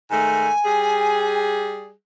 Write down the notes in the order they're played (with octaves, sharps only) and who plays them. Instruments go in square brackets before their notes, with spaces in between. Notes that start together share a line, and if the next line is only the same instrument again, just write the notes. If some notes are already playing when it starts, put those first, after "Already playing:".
[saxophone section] G#2 D#3 A3 [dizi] G#5
[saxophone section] G3 G#4